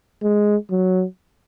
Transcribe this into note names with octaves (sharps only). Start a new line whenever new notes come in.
G#3
F#3